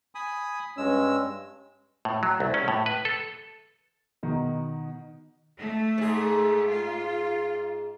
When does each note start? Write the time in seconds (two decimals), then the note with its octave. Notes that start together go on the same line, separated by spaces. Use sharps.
0.15 G#5 B5 D#6
0.77 G2 G#3 C#4 E6
2.05 A2
2.23 F#3
2.40 C2
2.54 C#4
2.68 A2
2.86 B4
3.05 A4
4.23 B2 D#3
5.57 A3
5.98 G#2 G#4
6.69 F4